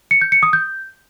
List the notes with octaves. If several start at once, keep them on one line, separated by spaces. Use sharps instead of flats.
C#7
G6
C#7
D#6
G6